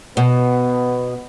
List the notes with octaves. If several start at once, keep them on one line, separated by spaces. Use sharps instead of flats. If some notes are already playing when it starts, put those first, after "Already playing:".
B2 B3